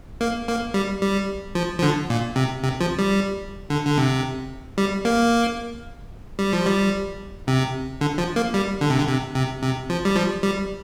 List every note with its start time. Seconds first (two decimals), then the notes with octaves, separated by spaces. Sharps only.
0.21 A#3
0.48 A#3
0.74 G3
1.02 G3
1.55 F3
1.79 F3
1.82 D3
2.10 A#2
2.36 C3
2.63 C3
2.81 F3
2.99 G3
3.70 D3
3.87 D3
3.97 C3
4.78 G3
5.05 A#3
6.39 G3
6.53 F3
6.66 G3
7.47 C3
8.01 D3
8.18 F3
8.36 A#3
8.54 G3
8.81 D3
8.90 C3
8.98 D3
9.08 C3
9.35 C3
9.63 C3
9.90 F3
10.05 G3
10.16 F3
10.43 G3